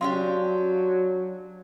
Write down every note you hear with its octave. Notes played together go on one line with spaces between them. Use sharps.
F#3 C#4 D4 G4 F5 C6